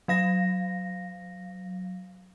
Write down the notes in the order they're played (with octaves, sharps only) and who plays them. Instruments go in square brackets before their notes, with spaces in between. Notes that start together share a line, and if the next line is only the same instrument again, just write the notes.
[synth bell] F#3 F5 A#6